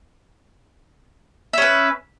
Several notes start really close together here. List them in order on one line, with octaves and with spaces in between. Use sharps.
E5 C#4 B4